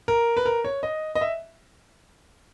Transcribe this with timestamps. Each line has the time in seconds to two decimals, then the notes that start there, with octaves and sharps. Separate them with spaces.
0.08 A#4
0.37 B4
0.46 A#4
0.65 C#5
0.83 D#5
1.15 D#5
1.21 E5